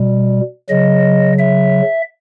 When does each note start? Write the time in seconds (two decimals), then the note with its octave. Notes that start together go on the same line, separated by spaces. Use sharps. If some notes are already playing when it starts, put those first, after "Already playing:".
Already playing: B2 G3
0.69 C#3 F#3 D#5
1.39 E5